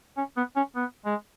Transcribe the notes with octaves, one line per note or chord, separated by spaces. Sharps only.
C#4
B3
C#4
B3
G#3